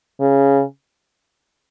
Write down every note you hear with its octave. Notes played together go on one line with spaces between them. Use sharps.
C#3